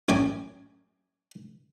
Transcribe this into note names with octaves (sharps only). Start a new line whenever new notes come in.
A1 F#2 G5 G#5 D6